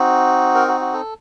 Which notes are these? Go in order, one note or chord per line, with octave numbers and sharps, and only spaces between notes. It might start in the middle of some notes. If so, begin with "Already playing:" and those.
Already playing: C4 D#4 F#4
A#4
F#4
F#4
A4